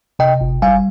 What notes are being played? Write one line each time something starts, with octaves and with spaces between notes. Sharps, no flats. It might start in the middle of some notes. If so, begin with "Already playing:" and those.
C3 D#5 G5
G1
G3 F5 G#5